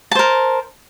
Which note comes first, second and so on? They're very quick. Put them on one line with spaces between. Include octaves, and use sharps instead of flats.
A5 C5 A#4